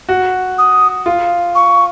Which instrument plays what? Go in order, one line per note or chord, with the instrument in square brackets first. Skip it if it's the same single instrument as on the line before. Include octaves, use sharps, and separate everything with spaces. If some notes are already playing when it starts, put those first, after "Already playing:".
[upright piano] F#4
[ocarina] D#6
[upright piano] F4
[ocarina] C#6